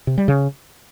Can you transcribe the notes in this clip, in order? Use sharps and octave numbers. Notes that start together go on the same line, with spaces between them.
C3
G3
C#3